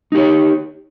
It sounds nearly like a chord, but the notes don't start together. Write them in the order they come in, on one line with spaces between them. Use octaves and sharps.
D#4 G4 C#5